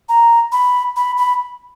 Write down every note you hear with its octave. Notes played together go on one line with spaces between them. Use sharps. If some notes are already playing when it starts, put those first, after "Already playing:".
A#5
B5
B5
B5